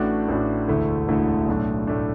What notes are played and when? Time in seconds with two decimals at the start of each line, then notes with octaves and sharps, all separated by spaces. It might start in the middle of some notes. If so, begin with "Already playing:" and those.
Already playing: A1 A2 A3 D4 F#4
0.29 A1 A2 A3 D4 F#4
0.68 E1 D2 D3 A3 E4
1.08 E1 D2 D3 A3 E4
1.48 B1 A2 A3 D4
1.87 A2 A3 D4